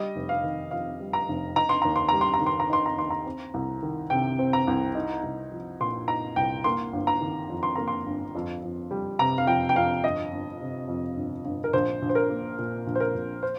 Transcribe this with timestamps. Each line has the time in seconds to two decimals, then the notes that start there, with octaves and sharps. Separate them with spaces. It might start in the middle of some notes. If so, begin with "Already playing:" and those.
Already playing: G3 D#5
0.15 F1
0.29 F5
0.43 D#3
0.71 F2 F5
1.00 G3
1.13 A#5
1.28 F1
1.56 D#4 A#5
1.69 C6
1.82 D#2 A#5
1.96 C6
2.09 G3 A#5
2.21 C6
2.34 A#5
2.41 D#3
2.46 C6
2.60 A#5
2.70 D#4 C6
2.86 A#5
2.97 D#2 C6
3.10 A#5
3.26 C4
3.54 C2
3.83 D#3
4.10 C3 G5
4.39 C4
4.53 A#5
4.67 C2
4.95 D#4
5.23 C2
5.52 F3
5.80 A#2 C6
6.08 D#4 A#5
6.36 C2 G5
6.64 A#3 C6
6.93 G1
7.07 A#5
7.21 D#3
7.50 F2
7.63 C6
7.76 A#3 A#5
7.88 C6
8.06 G1
8.35 F2
8.63 F2
8.91 G3
9.19 C3 A#5
9.38 F5
9.47 F2 G5
9.69 G5
9.76 F2 F5
10.03 G1 D#5
10.32 G1
10.60 C3
10.88 F2
11.16 G1
11.45 G1
11.64 A#4
11.73 A#1 C5
12.02 A#1
12.09 C5
12.15 A#4
12.30 A#3
12.58 A#2
12.87 A#1
12.95 C5
13.00 A#4
13.15 A#1
13.43 C5